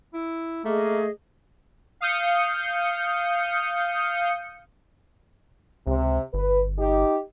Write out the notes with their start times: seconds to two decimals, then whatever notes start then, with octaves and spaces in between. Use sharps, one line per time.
0.14 E4
0.65 A3 A#3 G#4 D#5
2.01 F5 D#6 G6 C#7
5.87 C#2 C3
6.34 G1 B4
6.78 D#4 G4